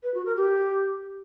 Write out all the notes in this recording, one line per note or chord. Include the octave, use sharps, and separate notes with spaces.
B4
F#4
A#4
G4